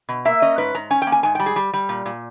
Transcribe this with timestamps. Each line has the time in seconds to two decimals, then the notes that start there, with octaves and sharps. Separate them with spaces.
0.09 B2
0.25 A#3 E5
0.42 C#4 D#5
0.58 G#2 B4
0.75 G#2 A#5
0.90 C#4 G#5
1.02 G5
1.07 A#3
1.12 G#5
1.23 G#2 G#5
1.35 G3 G5
1.46 G#4
1.56 G3
1.73 G3
1.89 A#2
2.06 A#2